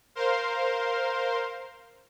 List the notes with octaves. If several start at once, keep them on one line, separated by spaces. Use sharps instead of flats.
A#4 C5 F5 C6